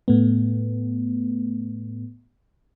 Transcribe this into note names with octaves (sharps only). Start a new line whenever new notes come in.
A2 A3 B3